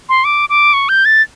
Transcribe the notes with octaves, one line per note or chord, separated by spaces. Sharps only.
C6
D6
D6
C#6
G6
A6